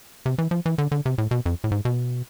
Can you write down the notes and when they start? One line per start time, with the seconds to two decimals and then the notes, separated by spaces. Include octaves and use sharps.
0.26 C3
0.38 E3
0.51 F3
0.66 E3
0.78 D3
0.92 D3
1.06 C3
1.18 A2
1.31 B2
1.46 F2
1.64 A2
1.71 G#2
1.85 B2